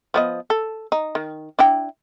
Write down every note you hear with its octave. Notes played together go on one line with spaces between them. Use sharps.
F3 B3 D#5
A4
D#4
D#3
D4 E4 G5